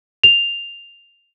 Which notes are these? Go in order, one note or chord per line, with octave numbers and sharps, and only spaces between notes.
F7